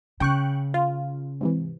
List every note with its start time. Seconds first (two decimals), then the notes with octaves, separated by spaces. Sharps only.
0.20 C#3 G5 C#6 F#6
0.74 F4
1.41 G#2 C3 E3